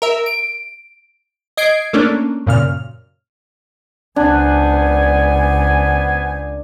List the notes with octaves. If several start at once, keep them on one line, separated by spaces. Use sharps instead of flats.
A#4 E5
D7
D#5 G#6 C7 D7
A3 A#3 C#4 D4
F#2 A#2 C#3 F6
C#2 B3 D4 C5 G#5